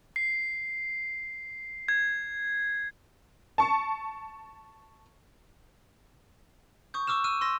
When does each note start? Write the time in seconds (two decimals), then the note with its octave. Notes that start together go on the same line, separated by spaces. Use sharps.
0.16 C7
1.88 G#6
3.58 A5 C#6
6.94 C#6 D#6 G6
7.07 C#6 D6 E6 F6 E7
7.24 E6 F6 D#7
7.41 C6 E6 A#6